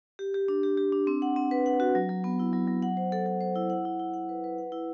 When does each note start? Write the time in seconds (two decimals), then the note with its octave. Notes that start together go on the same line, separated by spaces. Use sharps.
0.19 G4
0.34 G4
0.48 D4
0.63 G4
0.77 G4
0.92 D4
1.07 C4
1.22 F#5
1.36 C4
1.51 B4
1.66 F#5
1.80 F#4
1.95 F#3
2.09 F#3
2.24 B3
2.39 E4
2.53 F#3
2.68 F#3
2.82 F#5
2.97 C5
3.12 A4
3.26 A4
3.41 C5
3.56 E4
3.70 F#5
3.85 E4
3.99 E4
4.14 F#5
4.29 B4
4.44 B4
4.58 F#5
4.72 E4